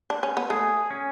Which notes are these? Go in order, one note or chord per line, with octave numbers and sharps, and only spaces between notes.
D4
C#4
B3
A3 G#4
C#4